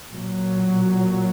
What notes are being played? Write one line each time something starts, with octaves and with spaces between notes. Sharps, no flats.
A#2 F#3